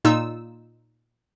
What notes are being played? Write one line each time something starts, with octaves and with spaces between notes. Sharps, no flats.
A#2 D#4 F4 E6